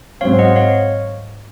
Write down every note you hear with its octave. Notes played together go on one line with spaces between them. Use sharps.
G#2 F#3 C4 C#5 F5
D#5 F#5
C#5 F5